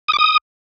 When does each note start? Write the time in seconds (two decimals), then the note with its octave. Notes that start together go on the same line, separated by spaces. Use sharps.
0.08 D#6
0.13 D6
0.19 D#6